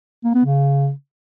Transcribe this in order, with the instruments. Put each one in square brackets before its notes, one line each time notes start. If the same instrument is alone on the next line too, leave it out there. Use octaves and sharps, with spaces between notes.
[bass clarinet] A#3
B3
C#3